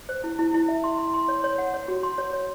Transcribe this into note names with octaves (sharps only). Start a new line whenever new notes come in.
C5
E4
E4
E4
E5
C6
C6
C6
C#5
C#5
F#5
C#5
F#4
C6
C#5
C#5